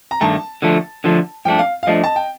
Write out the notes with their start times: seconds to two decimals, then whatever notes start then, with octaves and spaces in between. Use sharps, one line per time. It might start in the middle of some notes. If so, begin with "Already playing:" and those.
0.11 A#5
0.21 G2 D#3 A3 A5
0.62 D3 F3 A3
1.04 D3 F3 A3
1.45 G2 F3 A3 D4 G5
1.59 F5
1.83 F5
1.87 G2 F3 A3 D4 D#5
2.04 A5
2.16 G5